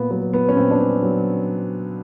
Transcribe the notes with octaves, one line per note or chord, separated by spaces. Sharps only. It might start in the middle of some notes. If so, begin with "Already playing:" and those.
Already playing: A#2 B3
F#3 B3
B3
C#4
A#2 C4
D4
C#4
F#3